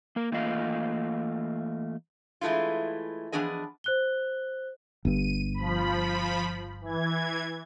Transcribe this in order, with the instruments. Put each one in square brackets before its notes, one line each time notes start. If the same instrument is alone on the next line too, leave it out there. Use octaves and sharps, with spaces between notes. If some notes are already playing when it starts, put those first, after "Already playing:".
[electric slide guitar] A#3 A#4
E3 A3 A#3 F4 D#5 F5
[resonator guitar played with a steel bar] E3 G#3 A3 E4 F4
E3 F3 B3 D4 G#4 D#5
[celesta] C5 F#6 G7
[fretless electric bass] G1 G2 [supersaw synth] D#7
[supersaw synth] F3 B5
E3 G#6